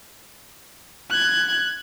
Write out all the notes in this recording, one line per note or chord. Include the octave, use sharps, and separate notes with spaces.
F#6 G#6